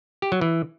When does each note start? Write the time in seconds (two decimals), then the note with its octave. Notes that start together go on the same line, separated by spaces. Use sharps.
0.22 G4
0.32 F#3
0.41 E3